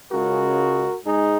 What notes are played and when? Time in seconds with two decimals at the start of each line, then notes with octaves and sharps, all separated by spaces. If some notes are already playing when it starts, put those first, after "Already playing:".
0.11 C#2 C#3 G#3 F#4 A#4
1.05 G#2 G#3 D#4 G#4